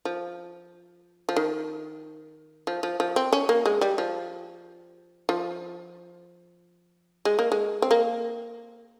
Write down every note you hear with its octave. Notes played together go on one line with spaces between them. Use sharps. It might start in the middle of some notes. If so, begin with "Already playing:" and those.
F3
F3
D#3
F3
F3
F3
C4
C#4
A#3
G#3
G3
F3
F3
G#3
A#3
G#3
C4
A#3